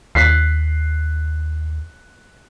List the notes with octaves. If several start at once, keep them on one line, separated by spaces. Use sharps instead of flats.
D#2 F#6 B6 C7